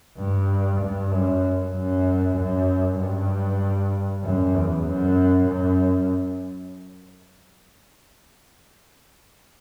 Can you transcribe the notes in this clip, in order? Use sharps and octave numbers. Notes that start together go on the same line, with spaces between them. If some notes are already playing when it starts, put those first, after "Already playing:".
G2
G2
F#2
F#2
F#2
G2
F#2
E2
F#2
F#2